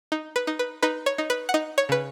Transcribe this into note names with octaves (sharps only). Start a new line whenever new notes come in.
D#4
B4
D#4
B4
D#4 B4
C#5
D#4
B4
F#5
D#4 D#5
C#5
C#3 B4